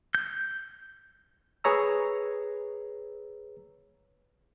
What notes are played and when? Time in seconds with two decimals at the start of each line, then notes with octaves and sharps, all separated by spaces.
0.15 G6
1.64 G#4 B4 C#5 A#5 E6